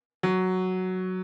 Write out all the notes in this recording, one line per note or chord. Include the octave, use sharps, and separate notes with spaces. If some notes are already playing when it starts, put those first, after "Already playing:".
F#3